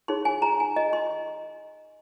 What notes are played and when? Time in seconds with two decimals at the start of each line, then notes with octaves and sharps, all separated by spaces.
0.08 D#4 G#4 C#5 C6
0.25 G#5
0.42 A#5
0.60 G#5
0.76 D#5
0.93 C6